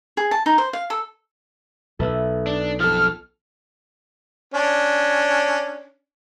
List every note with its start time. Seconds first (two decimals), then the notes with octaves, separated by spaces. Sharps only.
0.17 G#4
0.31 A5
0.46 D#4
0.58 C5
0.73 F5
0.90 A4
1.99 B1 A4 B4 E5
2.47 D4
2.80 F3 A4 F6 A6
4.54 C#4 D4